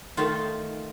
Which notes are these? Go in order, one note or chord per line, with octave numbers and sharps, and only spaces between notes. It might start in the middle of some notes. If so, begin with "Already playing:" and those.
D#3 A3 D#4 F4